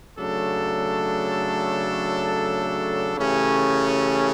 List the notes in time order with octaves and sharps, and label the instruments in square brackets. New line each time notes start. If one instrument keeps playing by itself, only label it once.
[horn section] C#3 F#3 A3 D4 A4
C#3 E3 A3 C#4 G4